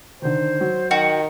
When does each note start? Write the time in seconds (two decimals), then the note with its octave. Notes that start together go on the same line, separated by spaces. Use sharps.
0.22 D3 D#3 C5
0.60 F#3
0.91 D#3 F#4 G5